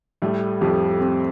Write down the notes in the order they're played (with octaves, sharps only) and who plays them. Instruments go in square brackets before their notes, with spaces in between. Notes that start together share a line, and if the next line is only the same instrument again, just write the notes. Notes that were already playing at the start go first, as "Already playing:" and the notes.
[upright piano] A2 A3 [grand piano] G3
[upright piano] F2 F3 [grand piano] G4
[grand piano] C4